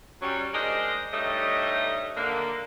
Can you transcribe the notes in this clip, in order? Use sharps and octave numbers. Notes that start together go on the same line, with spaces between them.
F#3 G3 C#4
G#3 D4 A#4 C5 D5 D#5
G2 G3 A3 D#4 C#5 D#5
D3 A#3